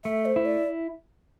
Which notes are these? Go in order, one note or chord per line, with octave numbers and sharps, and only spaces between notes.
A3 E5
C5
E4
D5